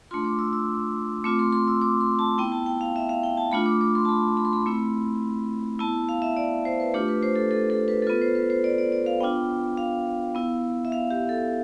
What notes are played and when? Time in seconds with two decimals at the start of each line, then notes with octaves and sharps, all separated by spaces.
0.11 A3 D4 F4 C6
0.25 D6
0.39 E6
0.53 E6
1.24 A3 C4 F4 D6
1.39 C6
1.52 C6
1.68 E6
1.81 D6
2.01 C6
2.19 A5
2.38 B3 E4 G5
2.52 A5
2.66 G5
2.81 F5
2.96 E5
3.09 F5
3.23 G5
3.37 A5
3.52 A3 D4 F4 B5
3.66 D6
3.81 D6
3.95 C6
4.05 A5
4.09 B5
4.37 B5
4.45 C6
4.53 B5
4.66 A3 C4 E4
5.79 B3 E4 A5
6.09 F5
6.22 E5
6.37 D5
6.65 C5
6.80 B4
6.94 A3 D4 F4 G4
7.08 B4
7.23 C5
7.36 A4
7.51 A4
7.70 A4
7.88 B4
8.02 A4
8.07 B3 F4 B4
8.21 C5
8.35 B4
8.50 C5
8.64 D5
8.78 D5
8.92 D5
9.06 F5
9.20 B3 D4 F4 G5
9.77 F5
10.35 B3 E4
10.85 E5
10.92 F5
11.11 G4
11.29 A4